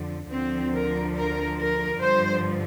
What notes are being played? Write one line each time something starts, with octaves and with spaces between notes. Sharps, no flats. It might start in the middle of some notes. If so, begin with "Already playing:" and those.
Already playing: F2 D3 F3
D2 D3 F3 C4
A#4
A#4
A#4
G2 D3 F3 C5